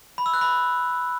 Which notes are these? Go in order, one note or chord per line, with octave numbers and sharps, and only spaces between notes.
B5
E6
F#6
B5